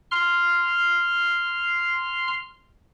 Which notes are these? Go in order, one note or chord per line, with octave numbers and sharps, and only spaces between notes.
C6 F6